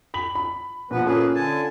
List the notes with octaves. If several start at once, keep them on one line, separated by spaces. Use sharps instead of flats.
B5 B6 F#7
B5
A#2 F3 B3 B4
A#3 C#4 F4 G#4 A4 B4
D3 G#5 A5